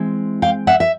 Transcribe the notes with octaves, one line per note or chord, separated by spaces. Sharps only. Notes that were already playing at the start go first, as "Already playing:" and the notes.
Already playing: E3 G#3 C4
F5 G5
E5 F#5
E5